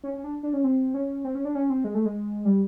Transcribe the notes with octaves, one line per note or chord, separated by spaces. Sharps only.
C#4
C#4
D4
D4
C#4
C4
C#4
C4
C#4
D4
C#4
C4
G#3
A3
G#3
G3